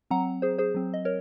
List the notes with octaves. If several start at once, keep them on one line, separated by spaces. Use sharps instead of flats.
F#3 C4 F#5 A#5
G#4 C5
G#4 C5
F#3 C4
D#5
A#4 C#5